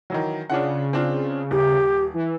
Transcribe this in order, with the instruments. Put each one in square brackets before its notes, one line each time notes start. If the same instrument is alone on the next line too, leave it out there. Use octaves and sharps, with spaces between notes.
[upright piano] D#3 E3 F#3
[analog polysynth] C#3 [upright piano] D4 F4 F#5
[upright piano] C4 D4 F4
[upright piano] D#1 [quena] G4
[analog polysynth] E3